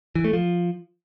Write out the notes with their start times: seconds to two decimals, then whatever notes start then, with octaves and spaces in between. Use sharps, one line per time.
0.15 E3
0.24 A3
0.33 F3